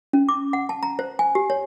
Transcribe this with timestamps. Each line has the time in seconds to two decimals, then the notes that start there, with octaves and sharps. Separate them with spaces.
0.13 C#4
0.29 D6
0.53 F#5
0.69 A5
0.83 A#5
0.99 C5
1.19 G#5
1.35 G4
1.50 C#5